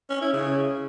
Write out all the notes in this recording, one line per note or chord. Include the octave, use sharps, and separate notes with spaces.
C#4
E4
C#3